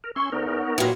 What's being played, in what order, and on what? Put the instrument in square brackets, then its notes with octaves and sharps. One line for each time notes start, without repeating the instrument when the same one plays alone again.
[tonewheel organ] A#4
[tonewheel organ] C#4 C6 [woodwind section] C#6 E6
[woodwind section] D2 [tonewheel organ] B3 D#4 A#4
[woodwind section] E2
C#5 F#5
[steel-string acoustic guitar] A#2 F#3 [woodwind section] E3 E4 G4